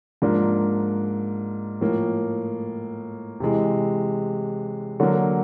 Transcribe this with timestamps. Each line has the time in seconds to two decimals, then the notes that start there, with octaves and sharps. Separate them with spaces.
0.22 G#2 F3 A#3 D4
1.81 A2 F3 A#3
3.40 C3 E3 G#3
5.00 D3 F#3 A#3